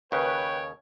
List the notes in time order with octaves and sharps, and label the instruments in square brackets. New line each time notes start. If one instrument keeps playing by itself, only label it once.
[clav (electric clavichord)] D#2 C#3 [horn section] B4 [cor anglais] C#5 [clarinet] G5